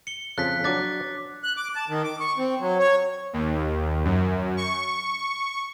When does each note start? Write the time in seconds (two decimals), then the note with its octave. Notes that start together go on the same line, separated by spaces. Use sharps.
0.07 C#7 G7
0.38 F2 C#3 A5 F#6 B6
0.64 F#3 D4 D6 F#6 A6
1.43 F#6
1.57 D6
1.75 A5
1.89 D#3
2.04 D6
2.20 C#6
2.38 C4
2.60 F#3
2.79 C#5
3.33 D#2
4.05 F#2
4.57 C#6